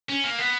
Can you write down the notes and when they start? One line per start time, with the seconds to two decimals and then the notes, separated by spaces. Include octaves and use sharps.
0.09 C#4
0.24 A#3
0.39 B3